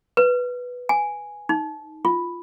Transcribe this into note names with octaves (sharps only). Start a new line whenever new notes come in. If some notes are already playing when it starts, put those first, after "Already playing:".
B4
G#5
D#4
F4